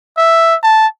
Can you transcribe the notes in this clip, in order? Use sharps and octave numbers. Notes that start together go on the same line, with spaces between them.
E5
A5